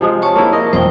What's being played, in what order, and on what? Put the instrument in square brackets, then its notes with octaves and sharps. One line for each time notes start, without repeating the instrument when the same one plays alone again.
[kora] C3 F3 G#3
[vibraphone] C#5 A5 C#6
[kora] A#3 E4 C5
[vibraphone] A#4 [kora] D#5
[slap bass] E1 F2 F3 [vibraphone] C5 G5